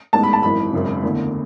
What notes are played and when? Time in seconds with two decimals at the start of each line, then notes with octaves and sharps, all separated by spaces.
0.13 A1 G#2 G#3 B3 A5
0.23 B5
0.33 A5
0.43 G#1 F#2 E3 B5
0.73 G#1 F#2 C#3
1.03 E2 D3 A3